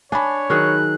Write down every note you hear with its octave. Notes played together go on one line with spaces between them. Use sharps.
D4 C#5 G#5 A5 B5
D#3 F#3 G#4 F#6